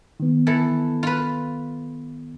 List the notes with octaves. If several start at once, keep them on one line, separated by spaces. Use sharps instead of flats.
D#3 B3
E3 A4
F4 B4